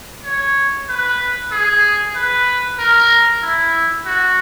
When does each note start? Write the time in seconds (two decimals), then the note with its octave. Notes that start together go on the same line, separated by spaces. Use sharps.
0.24 C#5
0.88 B4
1.51 G#4
2.15 B4
2.78 A#4
3.42 E4
4.06 F#4